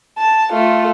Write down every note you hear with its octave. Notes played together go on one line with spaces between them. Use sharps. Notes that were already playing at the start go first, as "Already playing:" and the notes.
A5
A3 F4